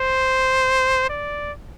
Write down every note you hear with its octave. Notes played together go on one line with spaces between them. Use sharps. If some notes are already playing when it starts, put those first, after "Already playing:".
Already playing: C5
D5